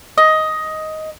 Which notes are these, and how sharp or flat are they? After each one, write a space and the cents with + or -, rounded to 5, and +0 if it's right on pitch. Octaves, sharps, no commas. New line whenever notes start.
D#5 +10